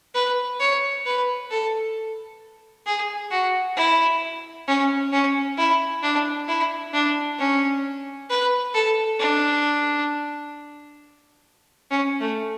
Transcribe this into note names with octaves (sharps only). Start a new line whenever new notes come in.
B4
C#5
B4
A4
G#4
F#4
E4
C#4
C#4
E4
D4
E4
D4
C#4
B4
A4
D4
C#4
A3